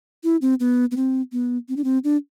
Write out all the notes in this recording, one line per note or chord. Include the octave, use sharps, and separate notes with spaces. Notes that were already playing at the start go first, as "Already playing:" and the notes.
E4
C4
B3
B3
C4
B3
C4
D4
C4
D4